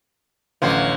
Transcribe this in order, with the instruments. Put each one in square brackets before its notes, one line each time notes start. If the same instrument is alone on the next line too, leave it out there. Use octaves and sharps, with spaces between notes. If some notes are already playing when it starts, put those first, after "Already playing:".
[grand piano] A1 D2 [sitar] F3 F#3